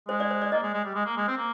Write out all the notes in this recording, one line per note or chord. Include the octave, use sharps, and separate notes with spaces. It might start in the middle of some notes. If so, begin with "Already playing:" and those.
G#3 C5
D5
C5
D5
A#3 D#5
G#3
G#3
G3
G#3
A#3
G#3
C4
A#3